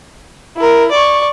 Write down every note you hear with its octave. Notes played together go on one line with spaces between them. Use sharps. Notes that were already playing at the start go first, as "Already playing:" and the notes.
E4 A#4
D5 C#6